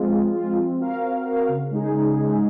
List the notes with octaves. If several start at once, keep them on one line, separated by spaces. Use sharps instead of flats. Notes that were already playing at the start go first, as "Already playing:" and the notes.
Already playing: F3 G#3 C4 F4
F3
G#3 C4 F4
C4
F#4 A#4 F5
C4
F#4 A#4 F5
C#3
G#3 D#4 G#4
C#3
G#3 D#4 G#4